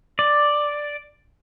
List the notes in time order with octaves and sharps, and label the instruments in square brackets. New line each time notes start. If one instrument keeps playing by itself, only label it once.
[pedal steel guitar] D5